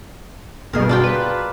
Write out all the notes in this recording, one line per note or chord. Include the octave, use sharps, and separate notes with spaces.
G1 B2 G#4 A#4
D4 F4 G5
B4